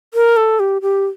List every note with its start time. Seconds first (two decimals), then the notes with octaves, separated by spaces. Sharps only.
0.14 A#4
0.37 A4
0.60 G4
0.82 G4